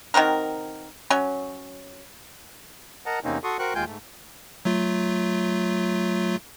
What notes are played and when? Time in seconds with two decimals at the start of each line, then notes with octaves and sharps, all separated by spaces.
0.14 D#3 C4 F#4 A#4
1.10 F#3 C#4
3.06 A#4 D#5 F#5 A5 A#5
3.24 E2 C3 A#3 C4 C#4 D#4
3.44 F#4 A4 C6 C#6 D#6
3.59 F#4 A#4 C5 G5 C#6 F#6
3.75 D#2 G#3 F4 G5 G#5 G6
3.87 G#2 A3
4.65 F#3 A3 F4